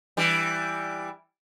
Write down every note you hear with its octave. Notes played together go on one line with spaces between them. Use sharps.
E3 G3